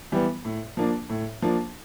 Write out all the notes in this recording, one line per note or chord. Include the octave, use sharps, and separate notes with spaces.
E3 G3 B3
A2
F3 A#3 D4
A2
F3 A#3 D4